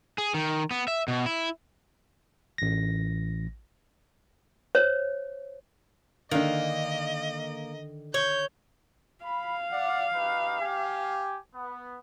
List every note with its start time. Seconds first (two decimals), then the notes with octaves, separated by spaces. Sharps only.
0.18 G#4
0.34 D#3
0.71 B3
0.88 E5
1.08 B2
1.26 E4
2.58 A1 A#6
4.75 C5 C#5
6.31 D3 D#3 A#3 D#5
8.14 C#5 G6
9.24 F5 B5
9.72 D5 F#5
10.15 D#4 G4 B4
10.61 G4 G#5
11.55 B3